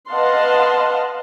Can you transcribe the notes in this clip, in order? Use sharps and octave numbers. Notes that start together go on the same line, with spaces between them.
B4 D#5 F5 F#5 A5 C6